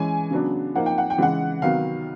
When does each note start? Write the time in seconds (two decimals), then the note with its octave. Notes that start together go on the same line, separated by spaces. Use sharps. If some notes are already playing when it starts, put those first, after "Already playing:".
Already playing: E3 G#3 C#4 G#5
0.31 C#3 F#3 B3 D4
0.75 F3 A#3 D#4 F#5
0.86 G5
0.98 F#5
1.10 G5
1.18 C#3 E3 G#3 F#5
1.62 C3 D#3 F#3 B3 F5